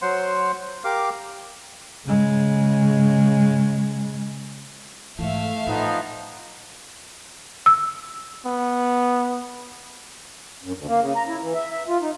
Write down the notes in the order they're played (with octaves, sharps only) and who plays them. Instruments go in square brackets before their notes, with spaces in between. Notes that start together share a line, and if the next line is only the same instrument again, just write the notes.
[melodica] F#3 C5 F#5 C6
G4 A#4 F5 D6
[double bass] C#3 G#3
[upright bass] G#2 E3 [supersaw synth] A3 [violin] E5 F5
[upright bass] A2 [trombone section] F3 B3 D#4
[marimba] E6
[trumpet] B3
[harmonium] F#2
D2
A#3
C#3
A#5
E4
E3
E5
E5
F4
D#4